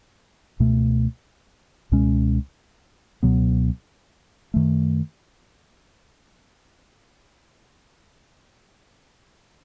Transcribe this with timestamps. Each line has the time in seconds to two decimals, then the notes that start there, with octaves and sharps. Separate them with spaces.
0.60 C#2 B2 A3
1.92 C#2 B2 G#3 C#4
3.23 C#2 B2 F#3 B3
4.54 F#2 D#3 A3